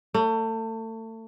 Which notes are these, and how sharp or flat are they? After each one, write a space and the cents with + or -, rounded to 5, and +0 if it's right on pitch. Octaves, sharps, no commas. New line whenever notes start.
A3 +30